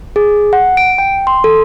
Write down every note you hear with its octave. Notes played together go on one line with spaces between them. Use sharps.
G#4
F#5
D7
G5
C6
A4